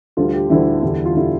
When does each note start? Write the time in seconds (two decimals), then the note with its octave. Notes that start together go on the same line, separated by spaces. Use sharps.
0.17 D2 D3 G3 F4
0.33 G4
0.50 D2 D3 G3 E4
0.83 E2 D3 G3
1.06 F4
1.16 D3 G3 E4